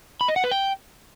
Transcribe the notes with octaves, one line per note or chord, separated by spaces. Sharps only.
B5
D#5
F#5
B4
G5